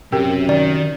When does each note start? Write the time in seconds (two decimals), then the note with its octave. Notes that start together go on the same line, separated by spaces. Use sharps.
0.12 F#2 C3 G4 A#4 G5
0.49 D#3 D5